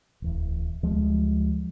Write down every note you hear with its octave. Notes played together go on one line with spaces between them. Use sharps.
D1 E2
D2 F3 G3 G#3